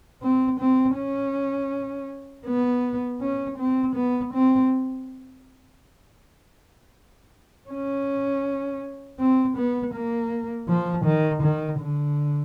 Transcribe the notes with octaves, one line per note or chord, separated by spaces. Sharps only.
C4
C4
C#4
B3
C#4
C4
B3
C4
C#4
C4
B3
A#3
F3
D#3
D#3
D3